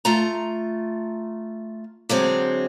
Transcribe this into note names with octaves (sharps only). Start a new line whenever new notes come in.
A3 F4 A#5
D3 F#3 G#3 C4